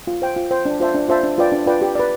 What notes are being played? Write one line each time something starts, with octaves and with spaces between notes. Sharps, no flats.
F4
C5 G5
F4
C5 G5
D4
F4 C5 E5 A5
D4
F4 C5 E5 A5
D4
F4 B4 D5 G5
D4
F4 B4 D5 G5
G4
B4 D5